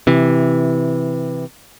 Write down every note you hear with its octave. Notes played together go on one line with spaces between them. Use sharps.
C3 E3